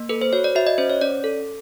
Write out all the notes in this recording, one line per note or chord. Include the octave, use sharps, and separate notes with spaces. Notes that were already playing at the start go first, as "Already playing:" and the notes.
Already playing: A#3
A4 B4
C5
F#4 C#5
D5
F#4 E5
D#5
C#4 C5
C#5
C#4 D5
A4